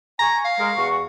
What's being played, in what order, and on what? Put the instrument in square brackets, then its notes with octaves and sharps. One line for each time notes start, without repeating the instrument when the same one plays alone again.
[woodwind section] G#5 C#6 [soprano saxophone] A#5
[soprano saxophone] F5
[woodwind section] G#3 A#4
E2 F#4 C#6